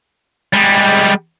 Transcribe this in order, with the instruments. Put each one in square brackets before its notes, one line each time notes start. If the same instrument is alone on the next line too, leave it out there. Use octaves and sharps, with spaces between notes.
[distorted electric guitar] G3 G#3